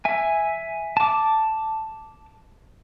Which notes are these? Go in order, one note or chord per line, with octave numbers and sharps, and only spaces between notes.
E5 G#5
A5 D6